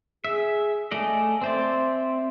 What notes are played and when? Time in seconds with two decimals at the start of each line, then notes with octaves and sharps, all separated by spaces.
0.24 G#4 E5
0.91 A3 D5 D#5 G#5
1.41 C4 C5 D5 E5